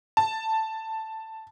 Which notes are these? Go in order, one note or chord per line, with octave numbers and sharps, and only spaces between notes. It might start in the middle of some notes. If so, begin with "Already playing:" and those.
A5